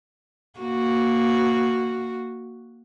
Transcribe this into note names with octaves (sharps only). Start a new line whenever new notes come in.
A#3 F#4